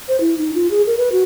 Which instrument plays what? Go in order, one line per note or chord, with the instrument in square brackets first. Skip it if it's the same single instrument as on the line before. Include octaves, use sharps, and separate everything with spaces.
[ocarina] C5
E4
D#4
F4
G#4
A#4
B4
F#4